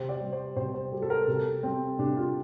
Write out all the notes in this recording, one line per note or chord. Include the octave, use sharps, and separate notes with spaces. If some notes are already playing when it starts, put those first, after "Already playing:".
Already playing: C3 C5
D5
G3
C5
C3 C5
C5
G3 A4
A4
A#4
C3 A4
G3 C4
C3 D4
F4